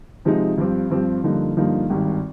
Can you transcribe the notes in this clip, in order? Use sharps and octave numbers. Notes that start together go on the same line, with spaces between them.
C3 F3 G#3 D#4
G2 F3 C4 G4
G2 F3 C4 G4
G2 D3 F3 A#3 D#4
G2 D3 F3 A#3 D#4
G#1 G2 D#3